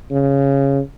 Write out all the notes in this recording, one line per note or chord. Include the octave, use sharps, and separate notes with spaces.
C#3